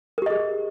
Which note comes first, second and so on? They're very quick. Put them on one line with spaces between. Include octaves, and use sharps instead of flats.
A#4 G4 D#5 G#4